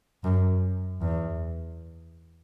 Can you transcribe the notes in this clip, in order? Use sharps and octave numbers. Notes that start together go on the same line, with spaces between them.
F#2
E2